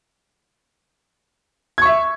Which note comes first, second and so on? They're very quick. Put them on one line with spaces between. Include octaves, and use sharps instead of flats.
G#6 C#6 E5